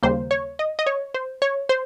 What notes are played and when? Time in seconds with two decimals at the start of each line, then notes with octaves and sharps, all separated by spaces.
0.03 D#2 C#3 G3 A#3 C5
0.31 C#5
0.59 D#5
0.79 D#5
0.86 C#5
1.14 C5
1.42 C#5
1.69 C5